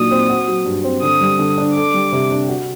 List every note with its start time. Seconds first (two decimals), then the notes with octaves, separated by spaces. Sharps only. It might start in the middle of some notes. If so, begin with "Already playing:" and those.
Already playing: A#2 F#3 D4 D#4 D#6
0.11 C4
0.29 F#4
0.48 F#3
0.65 G2
0.84 C4
1.02 D3 D#6
1.21 G3
1.39 D3
1.58 D4
1.76 A4 D6
1.94 G3
2.12 C3
2.31 D4
2.49 F#4